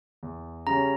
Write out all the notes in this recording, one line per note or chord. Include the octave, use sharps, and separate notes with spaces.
E2
C#3 G3 C#4 A#5